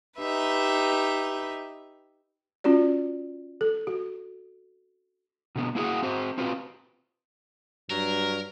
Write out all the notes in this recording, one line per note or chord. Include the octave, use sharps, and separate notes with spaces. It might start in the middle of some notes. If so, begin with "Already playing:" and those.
D#4 G4 B4 E5
C#4 F4 F#4 D5
A4
F#4
B2 D3 B3
A#3 E4 F#4 G#4 F#5
C4 F#4 C5
C4 F4 F#4 B4
G2 F#3 A#4